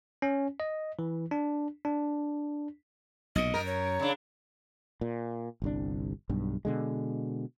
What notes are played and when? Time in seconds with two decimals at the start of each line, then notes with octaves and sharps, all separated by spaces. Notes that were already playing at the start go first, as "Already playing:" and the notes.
0.22 C#4
0.60 D#5
0.99 E3
1.31 D4
1.85 D4
3.35 B1 A#2 D#5
3.54 F#2 A#4
3.66 C#5
4.00 C#3 D4
5.01 A#2
5.62 G1 C2 D4
6.29 B1 G2
6.65 B2 D3 G#3